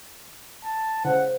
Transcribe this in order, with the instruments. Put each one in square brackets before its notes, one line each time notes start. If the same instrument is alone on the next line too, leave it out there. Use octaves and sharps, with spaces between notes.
[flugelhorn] A5
[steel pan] C#3 [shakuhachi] C5 [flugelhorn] F#5